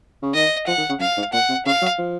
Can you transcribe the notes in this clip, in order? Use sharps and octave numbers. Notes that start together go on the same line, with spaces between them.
C#3
D#3 D#5
F3 F#5
D#3
C#3
F#2 F5
G#2
A#2 F#5
C3
C#3 F5
F#3
F3